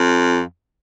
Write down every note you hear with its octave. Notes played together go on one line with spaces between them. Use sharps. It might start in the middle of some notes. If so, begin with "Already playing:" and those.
Already playing: F2